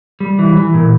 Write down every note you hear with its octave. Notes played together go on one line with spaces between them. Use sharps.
G3
E3
E3
A#2